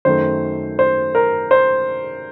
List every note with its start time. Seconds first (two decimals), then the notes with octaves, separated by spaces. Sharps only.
0.05 F#2 D#3 A3 C5
0.79 C5
1.15 A#4
1.51 C5